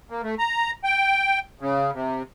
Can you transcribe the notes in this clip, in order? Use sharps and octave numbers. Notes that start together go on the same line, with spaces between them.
A#3
A3
A#5
G5
C#3
C3